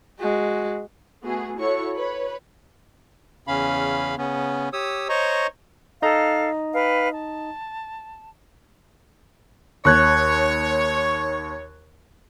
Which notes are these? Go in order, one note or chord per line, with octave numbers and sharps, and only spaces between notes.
G#3 F#4
A3 B3 F#4 G#4
E4 F#4 A4 C#5 C#6
B4 C#5 B5
E2 C#3 C#4 F5 B5
C#3 B3 C#4
G4 C#5 D#6 E6
C5 C#5 D#5 A#5 C#6
D#4 A4 D#5 F5 A#5
B4 F5 G5
A5
D#2 C#5 C#6 F#6 G#6